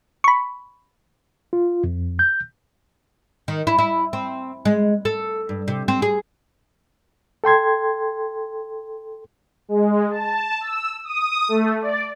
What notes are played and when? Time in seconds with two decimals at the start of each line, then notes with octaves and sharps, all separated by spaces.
0.24 B5 C#6
1.53 F4
1.84 F2
2.19 G6
3.48 D#3
3.67 E4
3.79 E4
4.13 C4
4.65 G#3
5.05 A4
5.49 G2
5.68 C3
5.88 C4
6.02 G#4
7.44 A4 G5 C6 G#6
9.69 G#3
10.11 A5
10.61 E6
11.05 D#6
11.49 A3
11.82 D5